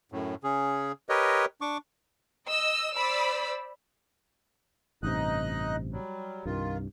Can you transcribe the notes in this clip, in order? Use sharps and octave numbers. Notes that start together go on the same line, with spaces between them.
F#2 A2
C#3 C#4 G#4
G4 A#4 B4 C#5 D#5
D4 C#6 D6
D#5 E6
C5 D5 B5 E6
A1 G2 C3 D#4 D#5 F#6
F#3 G3
C2 G2 D#3 F4